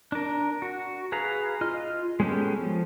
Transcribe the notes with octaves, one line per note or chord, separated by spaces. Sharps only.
D4 A#4
F#4
G#4 B4 F5 A#5
F4 D#5 F6
G#3 B3 C#4 G4 A4
F3